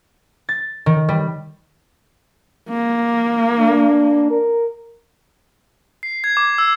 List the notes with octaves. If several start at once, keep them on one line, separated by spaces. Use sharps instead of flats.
A6
D#3
G3
A#3
D4
A#4
C7
G#6
D6
E6